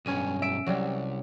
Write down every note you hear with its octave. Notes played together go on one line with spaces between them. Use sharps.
B1 G2 C#4 D#7
E5 D7
C2 F#3 G3